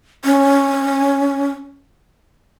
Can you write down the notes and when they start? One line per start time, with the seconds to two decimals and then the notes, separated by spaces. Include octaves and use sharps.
0.25 C#4